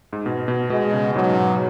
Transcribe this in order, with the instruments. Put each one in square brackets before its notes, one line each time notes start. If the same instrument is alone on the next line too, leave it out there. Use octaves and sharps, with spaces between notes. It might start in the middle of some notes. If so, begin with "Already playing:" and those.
[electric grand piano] G#2
B2
B2
[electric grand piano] B2 [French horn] G#3
[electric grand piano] C#3
[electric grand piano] G#2 [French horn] F#3
[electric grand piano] B2